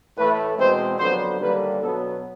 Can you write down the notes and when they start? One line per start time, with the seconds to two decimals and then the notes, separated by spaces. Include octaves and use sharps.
0.17 A2 E3 A3 B4
0.58 E2 B2 G#3 C4 C5
0.99 F2 D3 F#3 B3 C5
1.40 D#2 D3 G3 A#3 B4
1.81 B2 F#3 B3 A4